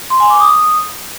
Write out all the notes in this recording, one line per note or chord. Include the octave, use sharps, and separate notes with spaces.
C6
G#5
D6
D#6